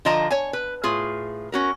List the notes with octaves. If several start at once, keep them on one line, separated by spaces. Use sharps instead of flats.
D3 F3 F4 D#5 A5 A#5
C#5 G#5
B4
A2 F4 G#4
C#4 F#4 A#4